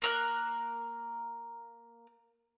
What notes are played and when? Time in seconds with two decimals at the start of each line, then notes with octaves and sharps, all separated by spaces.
0.02 A#3 A#4 F#6